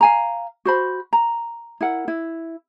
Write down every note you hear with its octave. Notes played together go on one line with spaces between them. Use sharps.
F5 G#5 A#5
F#4 C5 B5
A#5
E4 A#4 F#5
E4